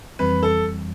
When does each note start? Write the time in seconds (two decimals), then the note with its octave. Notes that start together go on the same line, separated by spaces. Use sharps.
0.19 F2 E3 G3 C4 B4
0.43 A4